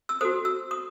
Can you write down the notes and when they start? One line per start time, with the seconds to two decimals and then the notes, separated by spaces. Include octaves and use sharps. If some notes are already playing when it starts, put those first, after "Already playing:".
0.09 E6
0.21 F#4 A4 C5 D#6
0.45 E6
0.71 D#6